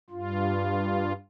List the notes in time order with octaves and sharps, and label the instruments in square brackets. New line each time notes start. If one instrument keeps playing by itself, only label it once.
[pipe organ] G2 F4